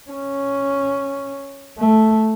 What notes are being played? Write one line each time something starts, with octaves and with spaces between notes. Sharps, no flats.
C#4
A3